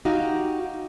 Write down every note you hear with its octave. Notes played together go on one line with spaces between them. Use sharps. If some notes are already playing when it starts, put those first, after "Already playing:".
D#4 F#4 G4 F5